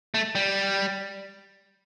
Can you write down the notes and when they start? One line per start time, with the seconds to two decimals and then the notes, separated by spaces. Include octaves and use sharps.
0.14 A3
0.35 G3